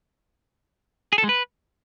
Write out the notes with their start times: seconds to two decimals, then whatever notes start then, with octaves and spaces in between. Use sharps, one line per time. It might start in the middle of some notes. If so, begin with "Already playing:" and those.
1.13 G#4
1.18 A4
1.24 G#3
1.29 B4